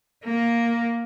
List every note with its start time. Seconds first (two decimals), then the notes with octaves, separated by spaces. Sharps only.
0.24 A#3